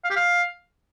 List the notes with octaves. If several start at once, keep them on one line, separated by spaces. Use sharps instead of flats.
F5
G4
F5